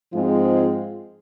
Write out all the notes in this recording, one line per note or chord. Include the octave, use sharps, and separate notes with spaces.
G#2 F3 G#3 C4 F4